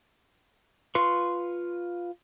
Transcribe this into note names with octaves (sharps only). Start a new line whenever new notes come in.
F4 B4 C6 C#6